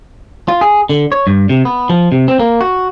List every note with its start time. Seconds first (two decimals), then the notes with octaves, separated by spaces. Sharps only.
0.48 F4
0.61 G#4
0.89 D3
1.12 C#5
1.27 G2
1.49 C3
1.65 B3
1.89 F3
2.12 C3
2.28 C4
2.39 A#3
2.61 F#4